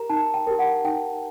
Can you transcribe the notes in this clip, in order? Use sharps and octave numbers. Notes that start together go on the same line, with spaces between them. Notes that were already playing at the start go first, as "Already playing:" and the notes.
Already playing: G4 A#4 A#5
D#4 A5
G5
G4 A#4
F#5
D#4 G5